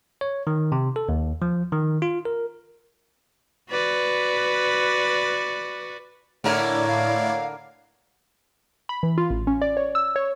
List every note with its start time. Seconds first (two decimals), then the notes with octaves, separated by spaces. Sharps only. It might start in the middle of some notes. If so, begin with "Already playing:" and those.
0.21 C#5
0.47 D#3
0.72 C3
0.96 A4
1.09 D#2
1.42 F3
1.72 D#3
2.02 F4
2.25 A#4
3.70 F#4 B4 D5
6.44 A2 D3 A#3 E4 A#4 C#5 D5
6.87 F5
8.89 B5
9.03 E3
9.18 F4
9.30 A1
9.47 C#4
9.62 D5
9.77 C#5
9.95 E6
10.16 C#5